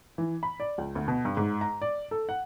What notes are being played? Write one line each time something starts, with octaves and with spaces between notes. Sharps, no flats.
E3
B5
D5
C#2
D2
B2
G2
G#2
A#5
D5
A4
F#5